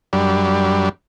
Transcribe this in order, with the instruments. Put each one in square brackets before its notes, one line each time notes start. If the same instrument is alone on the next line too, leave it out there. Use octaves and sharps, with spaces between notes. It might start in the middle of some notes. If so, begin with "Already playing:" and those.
[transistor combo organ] F#2 G3 D4